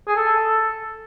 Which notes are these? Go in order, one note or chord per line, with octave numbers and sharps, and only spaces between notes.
G#4
A4